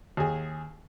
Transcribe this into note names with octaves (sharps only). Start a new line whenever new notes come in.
D#2 G#4